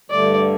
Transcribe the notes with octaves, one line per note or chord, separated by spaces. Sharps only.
G2 D3 A3 D5